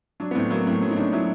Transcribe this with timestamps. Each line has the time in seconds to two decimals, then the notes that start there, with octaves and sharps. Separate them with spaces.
0.20 F#3 D4
0.31 B3
0.35 A2 C4
0.50 F#3 A#3
0.67 A2 C4
0.81 F#3 C#4
0.91 D#4
0.97 A2 D4
1.13 F#3 E4